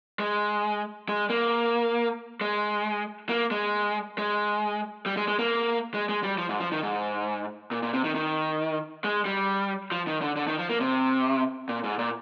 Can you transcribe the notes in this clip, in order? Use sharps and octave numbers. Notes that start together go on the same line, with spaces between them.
G#3
G#3
A#3
G#3
A#3
G#3
G#3
G3
G#3
G#3
A#3
G#3
G#3
G3
F3
G#2
F3
D#3
G#2
A#2
A#2
C3
D#3
D#3
G#3
G3
F3
D#3
D3
D3
D#3
F3
A#3
C3
A#2
G#2
A#2